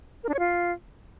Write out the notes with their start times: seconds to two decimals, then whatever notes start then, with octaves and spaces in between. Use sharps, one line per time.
0.24 A#4
0.29 D4
0.34 C#5
0.39 F4